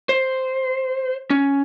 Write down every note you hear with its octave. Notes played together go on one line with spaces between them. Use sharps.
C5
C#4